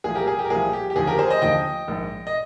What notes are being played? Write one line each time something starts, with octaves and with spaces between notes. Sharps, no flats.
C2 A#2 F3 G#4
G4 A#4
G#4
G4
A#4
C2 A#2 F3 G#4
G4
G4
D#2 D3 F3 G#4
G4 A#4
G#4 C5
C5 D#5
D#2 D3 F3 D#5 G5
A#1 G#2 D#3
D#5